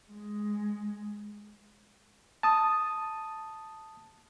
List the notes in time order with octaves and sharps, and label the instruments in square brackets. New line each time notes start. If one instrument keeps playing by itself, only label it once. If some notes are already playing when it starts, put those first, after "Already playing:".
[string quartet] G#3
[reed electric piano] A5 D#6